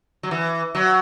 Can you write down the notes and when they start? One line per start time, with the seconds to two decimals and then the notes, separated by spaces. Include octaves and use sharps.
0.23 F#3
0.31 E3
0.75 F#3